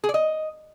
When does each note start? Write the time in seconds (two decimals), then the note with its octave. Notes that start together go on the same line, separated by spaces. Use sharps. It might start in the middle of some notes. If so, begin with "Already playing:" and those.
0.04 G#4
0.09 D5
0.14 D#5